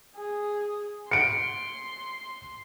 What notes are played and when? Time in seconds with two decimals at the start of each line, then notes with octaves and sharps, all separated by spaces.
0.17 G#4
1.11 C6 C#7 D7